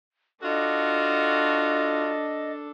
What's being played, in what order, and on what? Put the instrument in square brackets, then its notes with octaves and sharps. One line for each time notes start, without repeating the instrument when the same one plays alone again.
[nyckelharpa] D4 A4 [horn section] F4 F#4 [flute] D#5